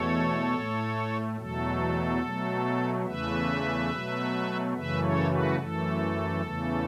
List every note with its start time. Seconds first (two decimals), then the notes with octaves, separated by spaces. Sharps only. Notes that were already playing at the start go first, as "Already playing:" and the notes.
Already playing: E2 B2 A3 A4 C#5
0.54 A2 A3
1.38 E2 B2 F#3 A3 A4
2.22 B2 F#3 A3
3.06 E2 C#3 E3 A3 B4 E5
3.90 B2 F#3 A3
4.74 F#2 C#3 E3 A3 B4 E5
5.02 A4 C#5
5.30 F#4 B4
5.58 F#2 E3 A3 A4
6.42 E2 C#3 E3 A3